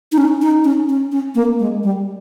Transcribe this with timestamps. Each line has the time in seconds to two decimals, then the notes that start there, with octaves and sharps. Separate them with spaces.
0.12 D#4
0.18 C#4
0.42 D#4
0.64 C#4
0.89 C#4
1.12 C#4
1.35 A#3
1.59 G#3
1.83 G3